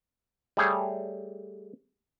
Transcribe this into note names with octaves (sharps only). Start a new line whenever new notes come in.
G3 A3 G#4 C#5